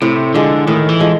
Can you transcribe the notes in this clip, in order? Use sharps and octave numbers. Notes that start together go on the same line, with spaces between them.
A2 C3
D3 F3 G#3
A2 D#3
E3
F3 G#3